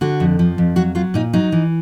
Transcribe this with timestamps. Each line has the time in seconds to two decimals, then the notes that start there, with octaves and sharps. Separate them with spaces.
0.01 D3 F#4
0.20 F2
0.39 F3
0.58 F2
0.76 F#3 F#4
0.95 F#3 F4
1.14 A#2 D#4
1.33 F#3 D#4
1.52 E3